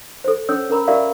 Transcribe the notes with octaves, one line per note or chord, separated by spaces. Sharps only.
A4 C5
C#4 A4 C#5 E6
C#4 A#4 A#5 B5
F4 G4 A#4 D5 E5 F5